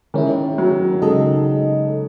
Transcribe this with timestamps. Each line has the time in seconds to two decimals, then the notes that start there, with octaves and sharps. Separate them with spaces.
0.14 D#3 G#3 C#4 E4
0.58 F#3
1.02 C#3 G#3 D#4 A4 D#5